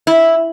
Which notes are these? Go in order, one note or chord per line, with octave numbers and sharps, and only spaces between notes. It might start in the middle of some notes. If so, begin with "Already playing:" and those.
E4